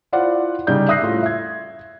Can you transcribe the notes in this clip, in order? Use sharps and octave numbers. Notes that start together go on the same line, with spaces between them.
E4 F4 C5 D5 F#5
C#3 G3 C#4 D#4 D5 G6
E5 D#6 F#6 A#6 C7
A2 F4
E5 G#6